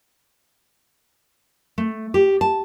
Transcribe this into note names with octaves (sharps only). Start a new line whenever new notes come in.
A3
G4
A5